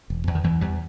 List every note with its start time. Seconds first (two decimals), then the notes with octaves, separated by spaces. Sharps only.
0.10 E1
0.27 E2
0.35 D#3
0.44 E2 E3
0.61 E2 G3